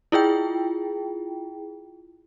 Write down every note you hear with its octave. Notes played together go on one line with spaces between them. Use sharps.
E4 F4 G#4 G5